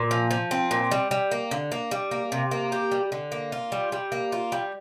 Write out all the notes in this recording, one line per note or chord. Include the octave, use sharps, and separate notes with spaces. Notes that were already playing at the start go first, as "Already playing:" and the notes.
Already playing: A#2
F3
F3
C4
A#2
G3
G3
A#3
D3
A#3
G3
A#3
C3
A#3
G4
G3
D3
A#3
F4
G3
G3
A#3
F4
G3